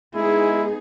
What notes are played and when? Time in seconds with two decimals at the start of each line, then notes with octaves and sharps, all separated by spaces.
0.15 G#3 B3 D#4 E4 G#4